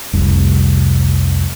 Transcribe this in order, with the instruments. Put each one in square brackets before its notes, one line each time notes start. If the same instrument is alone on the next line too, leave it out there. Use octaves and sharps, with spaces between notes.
[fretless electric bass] F1 C2